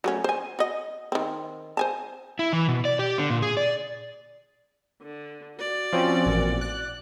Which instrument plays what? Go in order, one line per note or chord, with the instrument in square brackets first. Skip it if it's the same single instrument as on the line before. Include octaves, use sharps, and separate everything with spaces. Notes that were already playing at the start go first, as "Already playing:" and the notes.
[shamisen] F#3 A3 C#4
C5 G#5
F#4 D#5
D#3 C4
C5 G#5 A5
[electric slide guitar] E4
E3
B2
D5
G4
D3
A#2
G#4
D5
[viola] D3
F#4 D5
[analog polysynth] F3 C4 C#4
A1 A#2
F#6